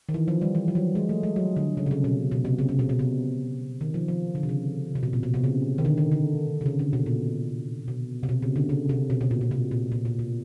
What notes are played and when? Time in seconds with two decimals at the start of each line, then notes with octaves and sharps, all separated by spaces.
0.09 D#3
0.14 E3
0.28 F3
0.41 G3
0.55 E3
0.68 F3
0.75 F#3
0.95 G#3
1.09 A3
1.23 G#3
1.36 F#3
1.57 D3
1.77 C#3
1.86 C3
1.91 C#3
2.04 B2
2.31 B2
2.45 C3
2.58 C#3
2.69 C3
2.79 B2
2.89 B2
2.99 C3
3.81 D#3
3.94 F3
4.08 F3
4.35 D3
4.43 C3
4.49 C#3
4.95 C3
5.03 B2
5.13 A#2
5.23 B2
5.34 C3
5.44 C#3
5.78 D#3
5.85 D3
5.98 D#3
6.12 D3
6.61 C3
6.66 C#3
6.79 D3
6.93 B2
7.06 A#2
7.88 B2
8.23 C3
8.29 B2
8.42 C#3
8.56 D3
8.69 C#3
8.89 C3
9.10 B2
9.21 B2
9.31 A#2
9.41 B2
9.51 C3
9.71 A#2
9.92 A#2
10.05 A#2
10.19 B2